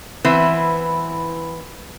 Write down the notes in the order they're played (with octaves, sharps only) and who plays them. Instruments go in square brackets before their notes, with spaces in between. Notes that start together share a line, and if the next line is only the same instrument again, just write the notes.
[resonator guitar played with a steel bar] E3 B3 C4 E4 B4